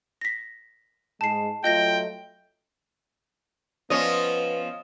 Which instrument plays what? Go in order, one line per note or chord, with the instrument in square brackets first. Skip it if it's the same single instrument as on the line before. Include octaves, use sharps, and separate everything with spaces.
[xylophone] A#6 B6
[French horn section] G#2 G#3 [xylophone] A5 C7
[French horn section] F#3 A3 F4 [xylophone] D#5 G6 A#6 [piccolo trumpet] G5
[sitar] F3 C#4 [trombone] B3 [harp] D#5